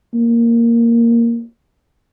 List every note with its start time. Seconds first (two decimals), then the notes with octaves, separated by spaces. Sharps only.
0.14 A#3